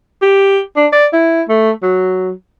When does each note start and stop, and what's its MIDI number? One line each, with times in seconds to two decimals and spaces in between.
0.22 0.60 67
0.76 0.87 62
0.92 1.06 74
1.13 1.42 64
1.49 1.71 57
1.83 2.31 54